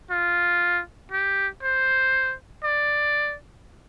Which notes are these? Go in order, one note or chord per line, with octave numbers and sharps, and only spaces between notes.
F4
G4
C5
D5